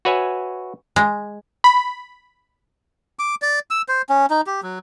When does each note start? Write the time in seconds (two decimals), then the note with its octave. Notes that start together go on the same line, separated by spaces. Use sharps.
0.05 F#4 B4 C#5 E5 G#5
0.96 G#3
1.64 B5
3.19 D6
3.42 D5
3.71 E6
3.88 C5
4.09 C#4
4.30 D#4
4.47 G4
4.63 F#3